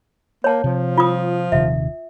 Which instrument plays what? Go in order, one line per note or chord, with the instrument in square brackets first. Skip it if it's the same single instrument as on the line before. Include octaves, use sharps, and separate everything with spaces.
[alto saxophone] A#3 [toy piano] C#5 A5
[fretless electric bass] C3 [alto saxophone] F3
[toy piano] F4 D#6
[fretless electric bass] D#1 C3 D#3 [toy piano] E5